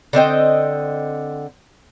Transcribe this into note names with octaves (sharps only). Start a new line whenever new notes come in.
D3 C4 D#5 G5